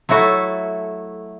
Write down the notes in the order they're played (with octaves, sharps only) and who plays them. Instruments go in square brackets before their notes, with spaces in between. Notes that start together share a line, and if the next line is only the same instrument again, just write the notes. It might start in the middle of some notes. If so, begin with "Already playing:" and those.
[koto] F#3 A3 E4 F#4 A4